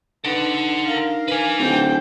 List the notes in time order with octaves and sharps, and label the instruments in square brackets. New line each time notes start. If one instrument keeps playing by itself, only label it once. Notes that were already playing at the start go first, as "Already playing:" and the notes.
[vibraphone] D4 D#4 [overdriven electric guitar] A4 F#5 [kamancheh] B4
[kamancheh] A#4 F5
[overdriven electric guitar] B4 G#5
[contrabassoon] D1 [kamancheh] C5 G5